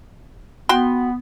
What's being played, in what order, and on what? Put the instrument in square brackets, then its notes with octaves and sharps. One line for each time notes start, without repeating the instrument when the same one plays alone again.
[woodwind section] B3 [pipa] F#4 G5 C6